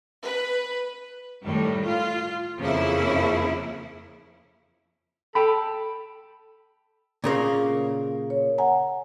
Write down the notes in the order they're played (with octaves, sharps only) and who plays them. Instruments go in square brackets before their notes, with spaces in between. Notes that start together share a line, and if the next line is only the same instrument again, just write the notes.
[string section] B4
[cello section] A2 D#3 G3
F4
F2 C#3 F3 A#3 E4
[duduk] A4 [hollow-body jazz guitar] G5 B5
[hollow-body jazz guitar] A#2 C#3 A#3
[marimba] C#5
F#5 G#5 A#5